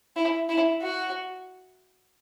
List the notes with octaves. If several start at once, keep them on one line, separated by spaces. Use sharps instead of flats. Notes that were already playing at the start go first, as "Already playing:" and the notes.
E4
E4
F#4